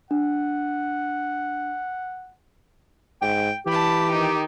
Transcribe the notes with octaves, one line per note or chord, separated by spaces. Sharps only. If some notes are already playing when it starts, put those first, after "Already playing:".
D4 F#5
G#2 G5
E3 G4 A5 B5
D#3 D#4